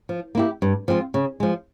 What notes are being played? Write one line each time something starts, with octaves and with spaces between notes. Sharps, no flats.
F3
A#3 E4 G4
G2
F3 G#3 C4 F4
C#3
F3 G#3